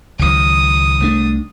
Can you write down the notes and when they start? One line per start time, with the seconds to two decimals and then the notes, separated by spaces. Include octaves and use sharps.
0.19 C#2 D#3 F#3 D#6
1.00 C2 A3 D4